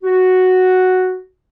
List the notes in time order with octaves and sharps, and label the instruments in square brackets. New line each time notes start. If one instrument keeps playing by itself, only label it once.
[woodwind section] F#4